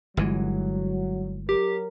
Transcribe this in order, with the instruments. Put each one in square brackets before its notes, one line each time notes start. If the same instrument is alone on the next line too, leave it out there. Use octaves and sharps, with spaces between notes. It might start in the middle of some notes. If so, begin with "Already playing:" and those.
[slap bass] G1 E3 G#3 [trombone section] F#3
[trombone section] F#3 A#4 [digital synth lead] G4